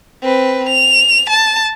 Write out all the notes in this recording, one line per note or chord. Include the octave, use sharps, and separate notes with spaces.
C4 B4
F7
A5